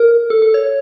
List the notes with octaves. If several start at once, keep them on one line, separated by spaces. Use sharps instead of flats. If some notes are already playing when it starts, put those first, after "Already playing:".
Already playing: A#4
A4
A4
C#5